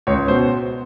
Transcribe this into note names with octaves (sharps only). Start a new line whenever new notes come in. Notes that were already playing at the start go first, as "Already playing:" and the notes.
C#2 C#5
B2 C5